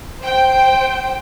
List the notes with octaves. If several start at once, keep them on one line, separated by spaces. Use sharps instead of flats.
C5 G5